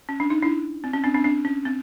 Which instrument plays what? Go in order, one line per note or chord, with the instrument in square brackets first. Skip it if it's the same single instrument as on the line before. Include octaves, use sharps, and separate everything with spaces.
[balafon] C#4
D4
D#4
D4 E4
C4
C#4
C4 D4
C4 D4
C4 D4
C#4
C4